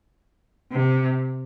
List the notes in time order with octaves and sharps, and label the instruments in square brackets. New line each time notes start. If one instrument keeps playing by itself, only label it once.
[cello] C3